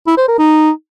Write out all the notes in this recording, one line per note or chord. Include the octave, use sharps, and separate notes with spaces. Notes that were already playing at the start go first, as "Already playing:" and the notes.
E4
C5
A#4
D#4